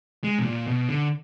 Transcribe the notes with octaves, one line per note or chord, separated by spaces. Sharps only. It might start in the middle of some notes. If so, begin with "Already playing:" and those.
G#3
B2
A#2
B2
D3